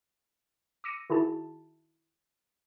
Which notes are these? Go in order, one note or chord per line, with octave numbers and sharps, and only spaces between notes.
D6 E6 A#6 C#7 D#7
D#3 E4 F#4 G#4 A5